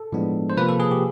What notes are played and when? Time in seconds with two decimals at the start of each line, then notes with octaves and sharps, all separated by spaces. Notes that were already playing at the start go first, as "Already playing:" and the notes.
Already playing: A4
0.12 A2 F3 G#3 B3 D4
0.50 C5
0.57 C3 F3 A#3 B4
0.69 A4
0.80 G#4
0.91 G4